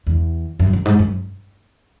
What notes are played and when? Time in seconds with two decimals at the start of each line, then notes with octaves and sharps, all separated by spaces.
0.07 E2
0.59 F#2
0.73 F#2
0.85 G#2
0.99 F#2